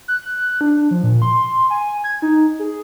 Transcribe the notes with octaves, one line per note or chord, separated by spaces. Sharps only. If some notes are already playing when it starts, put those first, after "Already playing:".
F#6
D4
F3
A#2
C6
G#5
G#6
D#4
G#4